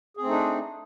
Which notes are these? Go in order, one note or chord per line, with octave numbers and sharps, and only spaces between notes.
A3 C4 D4 D#4 G#4